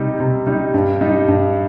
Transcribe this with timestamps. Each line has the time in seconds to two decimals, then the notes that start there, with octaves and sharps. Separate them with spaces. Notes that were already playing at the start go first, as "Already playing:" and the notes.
Already playing: C3 G3 D#4
0.20 C3
0.47 G3 D#4
0.74 G2
1.01 G3 D#4
1.28 G2